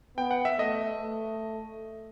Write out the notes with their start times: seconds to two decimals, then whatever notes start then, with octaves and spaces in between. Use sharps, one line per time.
0.17 B3 G5
0.31 F#5
0.45 E5
0.59 A3 D#5
1.02 A3